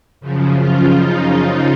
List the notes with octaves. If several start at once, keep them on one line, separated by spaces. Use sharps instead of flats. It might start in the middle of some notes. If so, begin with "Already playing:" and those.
F#2 C#3 F3
F4
D#4